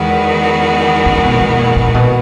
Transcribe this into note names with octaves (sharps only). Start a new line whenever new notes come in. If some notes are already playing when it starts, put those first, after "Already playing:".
Already playing: E2 D#3 G#3 B3 F#4
C#3
B2
B2
A#2
A#2
B2